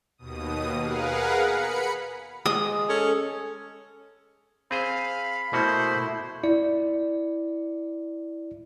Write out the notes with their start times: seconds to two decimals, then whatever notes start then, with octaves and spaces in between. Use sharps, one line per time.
0.18 D#2 B2 D#6
0.79 G#4 A#4 B4 F5 F#5
1.41 B5 C#7
2.46 G#3 D#6
2.89 C#4 A4
4.71 C4 G#4 C5 F5 B5
5.53 B2 A3 A#3 E4 F#4 C5
6.44 E4 D5